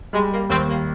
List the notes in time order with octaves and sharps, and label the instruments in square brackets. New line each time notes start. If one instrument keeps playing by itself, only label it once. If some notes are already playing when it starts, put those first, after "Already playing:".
[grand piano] G3 [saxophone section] G#3
[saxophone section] A#3
[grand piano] D#2 [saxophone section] C4
[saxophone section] A#3